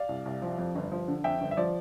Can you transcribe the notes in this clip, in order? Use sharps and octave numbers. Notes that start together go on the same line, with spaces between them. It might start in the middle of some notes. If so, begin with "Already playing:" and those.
Already playing: D5 F5
C2
C2
F3
F2
G1
F3
D3
F2 E5 G5
G1
E5
F3 D5